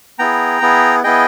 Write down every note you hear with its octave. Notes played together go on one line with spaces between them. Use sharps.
B3 E4 G#4 G5 A#5
B3 E4 G#4
B3 E4 G#4 D#5 G5